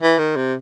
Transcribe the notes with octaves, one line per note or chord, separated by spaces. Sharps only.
E3
D#3
C3